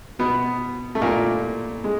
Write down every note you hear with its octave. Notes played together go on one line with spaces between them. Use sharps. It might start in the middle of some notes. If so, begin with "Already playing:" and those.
B2 B3
A3
A#2 A#3
G#3